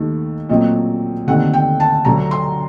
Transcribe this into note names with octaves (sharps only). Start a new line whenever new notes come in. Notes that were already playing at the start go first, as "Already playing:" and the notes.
Already playing: D#2 D#3 A3
A#2 F#3 A3 C4 D#5
D#2 D3 A3 C4 D#4 F#5
G5
A5
D2 D3 F#3 A#5
C6